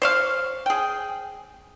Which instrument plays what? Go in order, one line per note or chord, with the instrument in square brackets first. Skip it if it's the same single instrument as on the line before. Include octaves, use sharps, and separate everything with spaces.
[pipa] C5 C#5 F5
G#4 G5